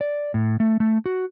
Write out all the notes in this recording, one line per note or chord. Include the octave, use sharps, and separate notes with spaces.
D5
A2
A3
A3
F#4